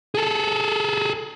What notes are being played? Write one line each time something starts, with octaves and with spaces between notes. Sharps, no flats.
G#4 A4